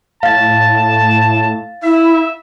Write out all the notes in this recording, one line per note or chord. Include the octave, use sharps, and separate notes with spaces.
A2 F5 A5 A6
E4 E5